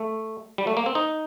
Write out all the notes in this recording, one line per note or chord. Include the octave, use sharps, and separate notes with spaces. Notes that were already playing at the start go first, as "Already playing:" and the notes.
Already playing: A3
G3
A3
A#3
C4
D#4